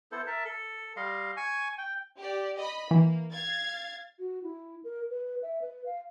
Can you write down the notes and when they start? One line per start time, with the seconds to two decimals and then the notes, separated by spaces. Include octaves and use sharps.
0.12 B3 E4 A4 C5
0.27 A#4 E5 A5
0.45 A4
0.96 G3 D#5 F5 C6
1.37 G#5 C#6
1.78 G5
2.19 G4 D5
2.58 D#5 B5
2.91 E3 A#3
3.31 F5 G#6 A6
4.19 F#4
4.43 E4
4.84 A#4
5.10 B4
5.42 E5
5.61 B4
5.86 F5